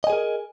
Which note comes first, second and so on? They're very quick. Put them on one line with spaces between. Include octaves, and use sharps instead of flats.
D#5 G#5 G#4 A#4